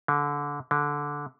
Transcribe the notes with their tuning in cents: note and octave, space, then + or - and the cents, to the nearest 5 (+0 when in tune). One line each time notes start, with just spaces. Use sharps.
D3 -20
D3 -10